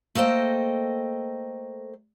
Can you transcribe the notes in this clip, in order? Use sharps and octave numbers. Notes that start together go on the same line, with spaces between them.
A3 A#3 A4 C5 D#5 G5